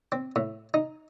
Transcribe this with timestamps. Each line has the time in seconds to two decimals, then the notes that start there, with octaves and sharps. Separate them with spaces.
0.12 C4
0.36 A2
0.74 D#4